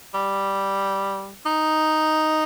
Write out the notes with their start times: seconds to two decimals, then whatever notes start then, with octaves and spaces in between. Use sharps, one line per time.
0.14 G3
1.45 D#4